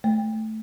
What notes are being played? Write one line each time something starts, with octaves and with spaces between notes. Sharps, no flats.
A3